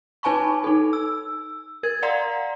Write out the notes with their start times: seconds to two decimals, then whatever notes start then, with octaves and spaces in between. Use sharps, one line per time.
0.23 D#4 B4 G#5 A5 B5 C#6
0.64 D#4 A4
0.93 E6
1.83 A#4 G#6
2.02 D5 F5 F#5 A#5 C6